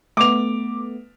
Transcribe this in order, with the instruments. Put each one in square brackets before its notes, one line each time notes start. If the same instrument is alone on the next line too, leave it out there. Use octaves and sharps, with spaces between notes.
[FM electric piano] A3 B3 [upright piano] D6 F7